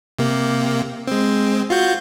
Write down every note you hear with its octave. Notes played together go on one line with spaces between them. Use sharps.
C3 A#3
G#3 C4
F4 F#4 G6